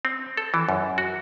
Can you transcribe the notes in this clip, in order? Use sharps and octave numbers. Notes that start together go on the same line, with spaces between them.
C4
A4
E3
F#2
F#4